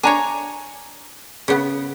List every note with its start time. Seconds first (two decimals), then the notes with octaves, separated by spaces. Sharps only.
0.03 D4 C#5 G#5 A#5
1.48 C#3 B3